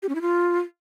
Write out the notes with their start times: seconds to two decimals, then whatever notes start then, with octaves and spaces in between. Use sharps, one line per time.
0.03 G4
0.09 C#4
0.15 E4
0.21 F4